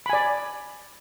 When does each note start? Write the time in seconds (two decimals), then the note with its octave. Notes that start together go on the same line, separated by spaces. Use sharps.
0.06 B5
0.10 G#5
0.13 D5